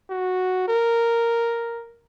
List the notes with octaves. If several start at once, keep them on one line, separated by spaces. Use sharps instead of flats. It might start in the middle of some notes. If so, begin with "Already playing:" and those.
F#4
A#4